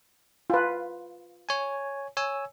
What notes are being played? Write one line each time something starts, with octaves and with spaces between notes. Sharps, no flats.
F4 B4
C#5 G#5
C#5 G#5 E6